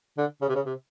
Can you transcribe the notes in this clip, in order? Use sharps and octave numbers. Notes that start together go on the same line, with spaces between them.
D3
C#3
C3
C#3
C3